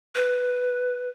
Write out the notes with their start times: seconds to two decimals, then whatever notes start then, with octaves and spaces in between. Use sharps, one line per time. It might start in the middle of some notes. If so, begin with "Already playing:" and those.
0.15 B4